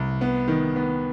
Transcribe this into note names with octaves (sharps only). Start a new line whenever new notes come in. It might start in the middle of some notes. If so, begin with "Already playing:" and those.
Already playing: C2
B3
D#3
B3